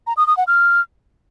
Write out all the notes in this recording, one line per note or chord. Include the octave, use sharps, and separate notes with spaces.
A#5
D#6
D#6
F#5
F6